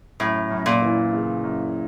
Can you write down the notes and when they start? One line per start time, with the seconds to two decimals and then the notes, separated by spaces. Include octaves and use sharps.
0.20 F#2 A2
0.51 F#2
0.66 A#2
0.82 E3
1.13 C#3
1.44 F#2